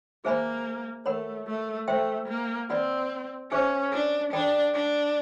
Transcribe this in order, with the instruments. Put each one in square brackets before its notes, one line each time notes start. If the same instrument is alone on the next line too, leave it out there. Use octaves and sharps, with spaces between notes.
[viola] A#3 [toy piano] G#4 C5 E5 G#5 B5
[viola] A3 [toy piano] A#4 C#5 F#5 B5
[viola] A3
[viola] A3 [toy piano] C5 E5 G5 C6
[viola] A#3
[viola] C4 [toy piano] B4 D5 F#5 B5
[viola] C#4 [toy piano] G#4 C5 E5 G#5 C#6
[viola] D4
[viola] D4 [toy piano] A4 D5 G5 B5
[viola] D4